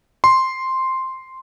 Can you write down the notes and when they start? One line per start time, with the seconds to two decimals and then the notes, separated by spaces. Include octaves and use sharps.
0.24 C6